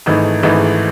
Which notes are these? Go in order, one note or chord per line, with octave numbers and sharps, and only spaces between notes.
G#1 G#2 E3 A3 D#4
G#1 G#2 E3 A3 D#4